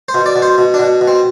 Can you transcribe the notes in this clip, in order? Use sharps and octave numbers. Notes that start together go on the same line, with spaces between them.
C5
B2
D5
B2
C5
B2
D4
B2
B2
C4